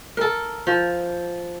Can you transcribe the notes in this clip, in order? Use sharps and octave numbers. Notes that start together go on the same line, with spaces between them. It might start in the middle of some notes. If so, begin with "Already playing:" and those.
A4 A#4
F3